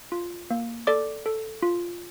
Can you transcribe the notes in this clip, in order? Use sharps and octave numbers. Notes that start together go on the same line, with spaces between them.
F4
A#3
A4 D5 D6
A4
F4